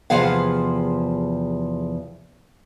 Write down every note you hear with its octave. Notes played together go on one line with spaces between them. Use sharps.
E2 C3 F3 G#4 F5 F#5